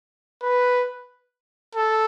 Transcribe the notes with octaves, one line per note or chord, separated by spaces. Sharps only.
B4
A4